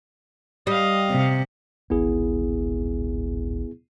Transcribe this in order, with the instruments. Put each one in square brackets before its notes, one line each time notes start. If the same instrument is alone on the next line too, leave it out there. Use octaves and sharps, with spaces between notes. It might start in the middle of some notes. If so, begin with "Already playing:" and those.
[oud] G3 [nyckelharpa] D#5 F5
[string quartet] C3
[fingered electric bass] D1 G#1 [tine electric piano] B3 E4 G#4